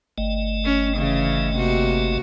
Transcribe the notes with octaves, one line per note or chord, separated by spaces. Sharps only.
G1 A3 D#5
C#4
C#3 E3 C#4
C3 A#3 F#4